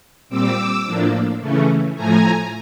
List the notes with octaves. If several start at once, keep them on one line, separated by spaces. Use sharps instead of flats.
A#2 G3 C4 D6 E6
A2 F3 A#3 D4
C#3 E3 A3 C#4
A2 F3 A3 G#5 A#5